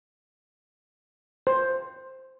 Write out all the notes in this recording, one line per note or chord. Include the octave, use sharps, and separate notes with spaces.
C5